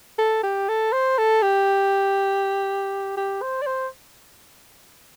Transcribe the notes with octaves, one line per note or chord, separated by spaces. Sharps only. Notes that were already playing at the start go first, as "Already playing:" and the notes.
A4
G4
A4
C5
A4
G4
G4
C5
D5
C5